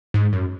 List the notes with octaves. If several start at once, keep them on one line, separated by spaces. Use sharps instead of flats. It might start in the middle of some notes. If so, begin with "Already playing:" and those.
G#2
F#2